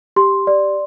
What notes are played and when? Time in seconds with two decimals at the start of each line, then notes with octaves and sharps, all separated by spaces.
0.16 G4 C6
0.47 D5